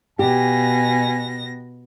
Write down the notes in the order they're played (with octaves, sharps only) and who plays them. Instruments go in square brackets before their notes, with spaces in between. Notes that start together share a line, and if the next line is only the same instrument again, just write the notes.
[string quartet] B2 A#6 [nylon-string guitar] G4 [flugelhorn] G#5